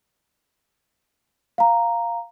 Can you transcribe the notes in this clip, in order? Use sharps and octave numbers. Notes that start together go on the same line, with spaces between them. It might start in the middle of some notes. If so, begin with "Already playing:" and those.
F5 A#5